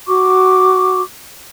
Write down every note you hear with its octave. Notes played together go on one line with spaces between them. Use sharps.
F#4 C#6 D6